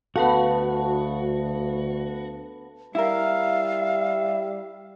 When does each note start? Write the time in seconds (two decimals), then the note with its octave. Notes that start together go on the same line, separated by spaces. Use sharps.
0.16 D2 B3 F#4 A4 F5 A5 B5
2.95 G3 E4 A#4 E5 F5